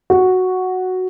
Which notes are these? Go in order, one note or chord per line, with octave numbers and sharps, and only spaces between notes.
F#4